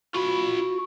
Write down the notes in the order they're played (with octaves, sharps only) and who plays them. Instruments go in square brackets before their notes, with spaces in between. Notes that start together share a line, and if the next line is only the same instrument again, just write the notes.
[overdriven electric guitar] F4 B5 [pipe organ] F#4